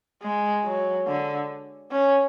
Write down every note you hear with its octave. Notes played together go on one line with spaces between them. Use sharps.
G#3
F#3
D3
C#4